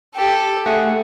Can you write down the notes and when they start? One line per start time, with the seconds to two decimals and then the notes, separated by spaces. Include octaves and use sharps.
0.15 G4 A4
0.66 A3 G#4 F#5